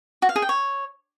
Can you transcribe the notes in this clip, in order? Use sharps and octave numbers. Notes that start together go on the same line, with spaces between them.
F#4
F5
G#4
G5
C#5